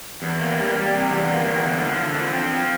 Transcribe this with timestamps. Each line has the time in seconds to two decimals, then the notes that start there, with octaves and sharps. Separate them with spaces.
0.22 E2
0.40 A#3
0.58 G3
0.76 G3
0.93 C3
1.10 E2
1.28 A#3
1.45 E2
1.63 D3
1.80 F3
1.98 D3
2.16 F3
2.33 C4
2.51 F3